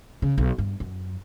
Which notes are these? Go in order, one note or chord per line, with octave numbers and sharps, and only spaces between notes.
C#3
B1
G2
F#2